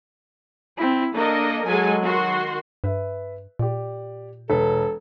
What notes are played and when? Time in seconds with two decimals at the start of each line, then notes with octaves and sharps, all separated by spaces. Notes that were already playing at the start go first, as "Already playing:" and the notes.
0.77 C4 E4
1.15 A#3 D4 A4 A#4 D#5
1.67 F#3 G#3 A4 G#5
2.04 D#3 F#4 C6
2.84 G2 B4 E5
3.59 A#2 G4 D5
4.50 E1 A4 B4